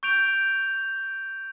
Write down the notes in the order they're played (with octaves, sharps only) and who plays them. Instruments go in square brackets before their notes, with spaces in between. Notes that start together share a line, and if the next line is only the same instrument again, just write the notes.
[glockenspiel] C#6 G6 D7 F7